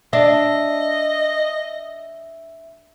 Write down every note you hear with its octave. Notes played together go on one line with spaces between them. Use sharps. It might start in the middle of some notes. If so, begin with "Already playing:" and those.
D4 D#5 E5